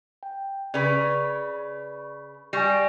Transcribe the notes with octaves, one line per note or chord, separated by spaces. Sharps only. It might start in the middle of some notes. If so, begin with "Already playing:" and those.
G5
C#3 B4 D5
G3 G#5 C#6 A#6